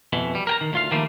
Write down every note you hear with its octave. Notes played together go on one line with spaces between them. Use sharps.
F2 B2 E3
G3
A#4 G5 A#5
D#3
D2 F4 F5
D3 D#3 F3 G3 A3 A#3